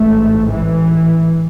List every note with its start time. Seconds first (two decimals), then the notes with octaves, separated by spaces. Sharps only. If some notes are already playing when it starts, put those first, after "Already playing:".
Already playing: A1 G#2 A3
0.50 E3